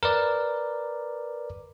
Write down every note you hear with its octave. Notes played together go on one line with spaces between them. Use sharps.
A#4 B4 D5